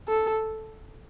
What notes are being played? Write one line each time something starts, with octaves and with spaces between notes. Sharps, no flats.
A4